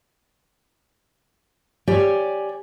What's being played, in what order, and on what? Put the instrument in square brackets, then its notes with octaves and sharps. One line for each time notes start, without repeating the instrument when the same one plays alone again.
[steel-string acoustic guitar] G4 C#5 D5 G#5